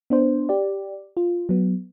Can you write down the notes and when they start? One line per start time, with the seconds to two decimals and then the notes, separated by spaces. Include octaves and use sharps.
0.10 B3 D4 C5
0.49 G4 D5
1.17 F4
1.49 F#3 B3